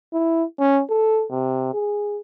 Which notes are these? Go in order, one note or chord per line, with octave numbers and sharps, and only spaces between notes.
E4
C#4
A4
C3
G#4